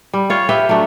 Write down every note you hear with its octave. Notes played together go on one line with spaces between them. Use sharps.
G3
F4 C#5
G4 B4 E5 G5
F#3 A3 D4